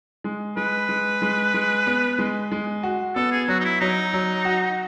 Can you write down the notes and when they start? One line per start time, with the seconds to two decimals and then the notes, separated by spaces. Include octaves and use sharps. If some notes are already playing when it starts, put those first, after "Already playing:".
0.24 G#3
0.57 G#3 B4
0.89 G#3
1.22 G#3
1.54 G#3
1.87 B3
2.19 G#3
2.52 G#3
2.83 F#4
3.15 B3 A4
3.32 G#4
3.48 F#3 F#4
3.60 D#4
3.65 E4
3.80 F#3 D#4
4.14 F#3
4.45 F#4